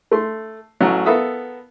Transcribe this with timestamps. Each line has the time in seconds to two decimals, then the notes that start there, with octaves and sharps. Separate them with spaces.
0.11 A3 C6
0.81 A1 A2 F#3
1.06 B3 A4 A#4 E5 F5 D#6